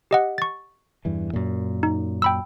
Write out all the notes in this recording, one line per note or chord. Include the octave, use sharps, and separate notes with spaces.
G4 D#5 F#5
C#6 A6
E2 G2 E3
F#2 A#2
D#4
G5 B5 E6